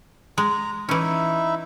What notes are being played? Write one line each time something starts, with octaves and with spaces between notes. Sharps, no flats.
G#3 A#5
E3 C#4 D#4 E4 E5